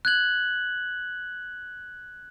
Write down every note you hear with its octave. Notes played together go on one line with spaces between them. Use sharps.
F#6 G#6 F#7